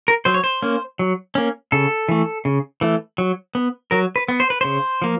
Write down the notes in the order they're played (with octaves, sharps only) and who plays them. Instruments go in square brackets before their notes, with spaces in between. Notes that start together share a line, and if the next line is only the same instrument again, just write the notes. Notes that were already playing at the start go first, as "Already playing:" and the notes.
[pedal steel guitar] A#4
F#3 C5
C#5
C5
A#3 C#4
F#3
A#3 C#4
C#3 A4
E3 A3
C#3
E3 A3
F#3
B3
F#3 A#4
B4
B3
C5
B4
C#3 C5
F3 A#3